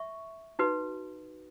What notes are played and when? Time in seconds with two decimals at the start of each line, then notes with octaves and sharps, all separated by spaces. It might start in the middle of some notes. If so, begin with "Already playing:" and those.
Already playing: E5 C#6
0.59 D#4 F#4 B4